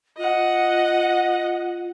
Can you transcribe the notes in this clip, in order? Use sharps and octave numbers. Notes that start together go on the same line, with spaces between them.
F4 D#5 F#5